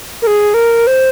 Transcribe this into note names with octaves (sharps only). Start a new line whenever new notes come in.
A#4
G#4
A#4
C5